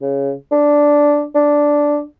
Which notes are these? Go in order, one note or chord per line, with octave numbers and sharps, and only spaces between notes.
C#3
D4
D4